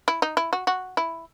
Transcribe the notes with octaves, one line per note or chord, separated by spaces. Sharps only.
E4
D#4
E4
F#4
F#4
E4